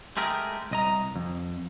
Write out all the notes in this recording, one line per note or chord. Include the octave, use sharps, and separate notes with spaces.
G#3 A3 G4 G#4 A#4
C2 D#5 A#5
F2